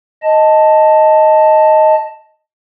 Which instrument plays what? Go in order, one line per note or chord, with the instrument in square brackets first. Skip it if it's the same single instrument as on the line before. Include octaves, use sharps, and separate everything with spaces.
[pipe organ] D#5 A5